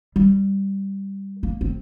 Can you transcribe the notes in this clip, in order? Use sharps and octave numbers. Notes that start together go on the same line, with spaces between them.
G3
A#3
C4